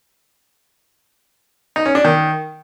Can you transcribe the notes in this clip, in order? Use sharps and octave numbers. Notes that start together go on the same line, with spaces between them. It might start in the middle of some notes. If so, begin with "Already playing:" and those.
D#4
C#4
D4
D#3